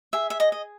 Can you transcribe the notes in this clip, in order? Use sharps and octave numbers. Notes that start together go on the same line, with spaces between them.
G#4 E5
E5
D#5
D#5